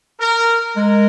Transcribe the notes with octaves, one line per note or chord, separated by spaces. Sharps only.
A#4
G#3 A#4